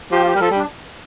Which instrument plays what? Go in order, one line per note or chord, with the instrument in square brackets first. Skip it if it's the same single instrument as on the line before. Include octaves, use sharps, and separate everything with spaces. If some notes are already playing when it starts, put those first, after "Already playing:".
[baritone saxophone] F3 [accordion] G4
[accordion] F4
G4
[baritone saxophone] G3 [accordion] A#4
[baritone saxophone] F3 [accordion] A4
[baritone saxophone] G3 [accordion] D4